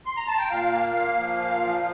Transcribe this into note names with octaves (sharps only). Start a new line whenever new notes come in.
C6
A#5
A5
G5
A#2 F5
A#3
A#3
F3
A#2
F3